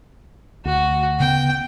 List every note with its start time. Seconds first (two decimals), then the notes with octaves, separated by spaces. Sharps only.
0.65 D2 F#4
1.20 C#3 B3 G5